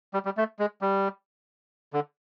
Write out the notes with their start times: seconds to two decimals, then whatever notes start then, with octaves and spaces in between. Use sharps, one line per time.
0.14 G3
0.25 G3
0.37 A3
0.59 G#3
0.81 G3
1.93 D3